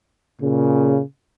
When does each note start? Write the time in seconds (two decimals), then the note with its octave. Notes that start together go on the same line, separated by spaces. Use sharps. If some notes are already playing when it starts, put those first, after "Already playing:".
0.41 A#2 C#3